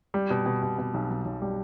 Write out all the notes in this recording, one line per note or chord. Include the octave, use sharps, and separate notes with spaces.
G3
B2
B2
B2
B2
B1
B1
B1
G3